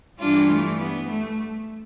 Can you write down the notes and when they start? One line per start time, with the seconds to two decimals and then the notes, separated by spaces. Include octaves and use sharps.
0.20 G2 E3 G3 D4 F4
0.49 A3
0.79 B3
1.08 A3